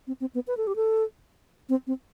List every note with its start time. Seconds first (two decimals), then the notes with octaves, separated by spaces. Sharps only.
0.07 C4
0.21 C4
0.35 B3
0.47 B4
0.57 A4
0.67 G4
0.76 A4
1.69 C4
1.87 C4